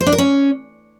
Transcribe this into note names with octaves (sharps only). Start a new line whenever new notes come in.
C5
D4
A#4
C#4